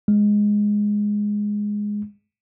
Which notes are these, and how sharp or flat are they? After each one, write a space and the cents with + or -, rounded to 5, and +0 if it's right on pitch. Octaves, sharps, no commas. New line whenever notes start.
G#3 -5